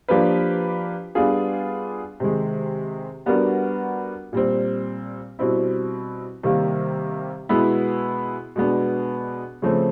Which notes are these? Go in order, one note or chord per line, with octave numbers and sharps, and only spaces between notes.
F3 A#3 D4 G4 B4
G3 B3 D4 F4 G#4
C3 D#3 G#3
G3 B3 D4 F#4 A#4
A#2 G3 C4
B2 G3 C4 E4
C3 D#3 G3 A#3
B2 G#3 B3 E4
B2 G#3 B3 D4
C#3 F3 A3 C4